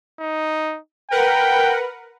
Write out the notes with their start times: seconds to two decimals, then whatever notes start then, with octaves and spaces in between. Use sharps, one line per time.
0.20 D#4
1.11 A#4 B4 F#5 G5